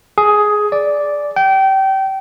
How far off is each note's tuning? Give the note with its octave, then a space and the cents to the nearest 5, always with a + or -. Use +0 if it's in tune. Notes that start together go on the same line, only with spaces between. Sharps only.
G#4 +10
D5 -5
G5 -25